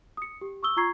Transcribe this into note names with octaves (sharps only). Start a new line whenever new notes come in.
D#6 C#7
G4
C#6 D#6 E6 G7
F4 A#5 C#6 G#6 C7